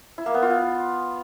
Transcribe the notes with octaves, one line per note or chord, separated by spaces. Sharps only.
E4
A#3
B3
F4